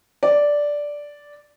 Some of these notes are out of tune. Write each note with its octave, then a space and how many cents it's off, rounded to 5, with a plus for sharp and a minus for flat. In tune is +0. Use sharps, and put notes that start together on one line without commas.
D5 -5